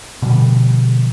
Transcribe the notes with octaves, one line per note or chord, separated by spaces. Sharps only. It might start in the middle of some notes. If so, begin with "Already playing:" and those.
B2 D3 F3 G3